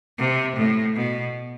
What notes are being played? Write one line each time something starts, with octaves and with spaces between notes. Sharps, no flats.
C3
A2
B2